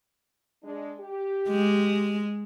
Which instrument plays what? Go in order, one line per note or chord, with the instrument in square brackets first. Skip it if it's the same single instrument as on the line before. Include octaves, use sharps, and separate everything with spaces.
[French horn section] G#3 D4
G4
[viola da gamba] G#3